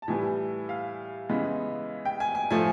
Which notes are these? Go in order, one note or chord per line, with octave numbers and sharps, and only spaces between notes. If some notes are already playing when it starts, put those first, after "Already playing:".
A5
A2 E3 G3 G#5
F5
C#3 E3 G#3 B3
G5
G#5
G#5
A2 F3 A3 G#5